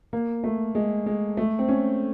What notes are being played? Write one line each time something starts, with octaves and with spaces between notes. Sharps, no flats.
A#3
A3
G#3
G#3
A3
C4
C#4